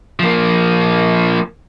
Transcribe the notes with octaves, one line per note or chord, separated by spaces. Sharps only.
F3 A#3